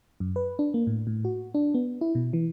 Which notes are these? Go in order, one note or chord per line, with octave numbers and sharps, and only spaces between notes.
F#2
B4
D4
A#3
A2
A2
F#4
D4
B3
E4
B2
E3